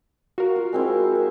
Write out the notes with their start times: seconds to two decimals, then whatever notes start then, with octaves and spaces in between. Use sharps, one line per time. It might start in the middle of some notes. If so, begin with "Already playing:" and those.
0.38 F#4 A#4 F5
0.56 F4
0.73 G#3 C4 E4
1.15 E5